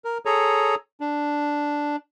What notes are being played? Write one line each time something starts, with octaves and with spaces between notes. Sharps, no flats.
A#4
G#4 A4 C#5 A#5
D4